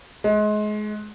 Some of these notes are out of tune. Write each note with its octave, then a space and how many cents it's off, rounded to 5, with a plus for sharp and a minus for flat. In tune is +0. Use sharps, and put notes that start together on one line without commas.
G#3 +30